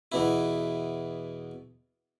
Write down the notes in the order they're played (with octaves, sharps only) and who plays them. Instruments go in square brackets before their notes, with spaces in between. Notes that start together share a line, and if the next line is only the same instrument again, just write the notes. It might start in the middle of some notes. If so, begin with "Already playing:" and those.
[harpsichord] E2 B2 E4